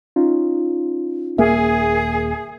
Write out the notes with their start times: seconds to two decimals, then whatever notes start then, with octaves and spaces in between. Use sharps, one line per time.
0.16 C#4 D#4 F4
1.38 D#1 A#3 G#4 E5